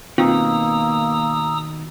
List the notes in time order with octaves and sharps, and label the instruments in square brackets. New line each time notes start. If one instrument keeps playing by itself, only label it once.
[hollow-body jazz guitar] B2 D#3 [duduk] A#3 [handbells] C4 F4 [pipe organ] A#5 D#6 E6